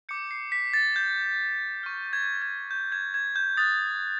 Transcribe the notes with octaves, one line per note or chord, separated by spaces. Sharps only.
D6 G6 C#7
C7
B6
A6
G6
C#6 F6
G#6
G#6
G6
G#6
G#6
G6
D#6 F#6 A6